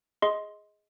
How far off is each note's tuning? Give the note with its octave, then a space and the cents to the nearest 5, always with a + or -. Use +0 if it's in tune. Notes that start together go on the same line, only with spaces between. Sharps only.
G#4 +0 D#5 +15 C6 +0